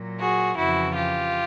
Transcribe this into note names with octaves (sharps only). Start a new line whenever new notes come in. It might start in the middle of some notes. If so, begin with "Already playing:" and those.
Already playing: A#2 F#3
F#4 G#4
F2 C#3 E3 E4 F#4
F4 G4